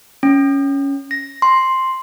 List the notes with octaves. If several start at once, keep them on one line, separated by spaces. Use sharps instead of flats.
C#4
A#6
C6